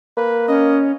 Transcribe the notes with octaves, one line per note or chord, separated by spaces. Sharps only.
A#3 B4
C#4 D#5